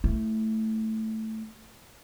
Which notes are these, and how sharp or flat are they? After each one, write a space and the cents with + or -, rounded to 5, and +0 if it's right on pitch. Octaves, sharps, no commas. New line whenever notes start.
A3 +0 E4 +0